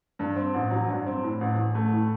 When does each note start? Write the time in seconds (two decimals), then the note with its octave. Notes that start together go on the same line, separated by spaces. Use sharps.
0.19 G2
0.36 C4
0.54 A1
0.71 F#3
0.88 G2
1.06 C4
1.24 A2
1.41 A1
1.57 A1
1.75 A3
1.93 A2